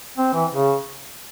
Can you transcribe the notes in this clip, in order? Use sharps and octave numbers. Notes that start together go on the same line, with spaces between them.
C4
E3
C#3